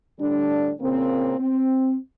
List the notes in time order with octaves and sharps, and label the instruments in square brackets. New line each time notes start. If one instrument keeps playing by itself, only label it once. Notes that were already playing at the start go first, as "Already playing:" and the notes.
[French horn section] A2 D3 G3 D4
A#2 C#3 A#3 C4
C4